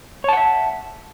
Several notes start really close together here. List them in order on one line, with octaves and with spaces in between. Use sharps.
C#5 A5 F#5 E5